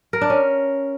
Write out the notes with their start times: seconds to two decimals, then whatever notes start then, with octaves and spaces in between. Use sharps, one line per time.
0.13 A#4
0.21 D4
0.30 C#4